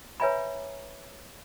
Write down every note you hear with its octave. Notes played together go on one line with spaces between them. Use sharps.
B4 C#5 E5 G#5 A#5 B5